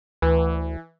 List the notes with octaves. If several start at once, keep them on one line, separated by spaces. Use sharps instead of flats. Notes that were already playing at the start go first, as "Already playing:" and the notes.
D2 E3